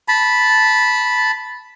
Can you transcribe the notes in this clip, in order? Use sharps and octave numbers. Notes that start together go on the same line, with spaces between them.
A5 B5